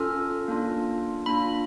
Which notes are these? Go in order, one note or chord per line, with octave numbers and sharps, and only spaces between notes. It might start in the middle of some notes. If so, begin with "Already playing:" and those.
Already playing: C#4 F4 A4 F6
A#3 D4 F4
A#3 D4 F4 B5